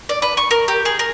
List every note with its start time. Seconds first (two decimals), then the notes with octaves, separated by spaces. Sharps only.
0.09 D5
0.22 B4
0.37 C#6
0.51 A#4
0.68 G4
0.85 G#4
0.99 A#4